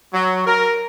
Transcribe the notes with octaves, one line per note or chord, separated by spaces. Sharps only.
F#3
A#4